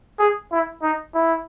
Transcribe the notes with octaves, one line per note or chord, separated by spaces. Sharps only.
G#4
E4
D#4
E4